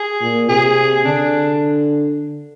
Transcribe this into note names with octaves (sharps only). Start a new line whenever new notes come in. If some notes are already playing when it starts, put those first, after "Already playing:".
Already playing: G#4
A#2
C3 G#4
D3 D4